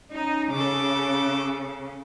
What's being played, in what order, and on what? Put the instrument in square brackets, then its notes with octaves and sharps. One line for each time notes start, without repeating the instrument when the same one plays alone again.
[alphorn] C#4 [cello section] D#4
[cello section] C#3 [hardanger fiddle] A4 D6